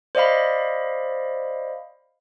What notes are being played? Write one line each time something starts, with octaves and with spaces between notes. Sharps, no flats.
C5 D5 D#5 F5 B5